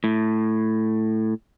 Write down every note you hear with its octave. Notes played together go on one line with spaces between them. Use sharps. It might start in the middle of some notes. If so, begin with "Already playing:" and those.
A2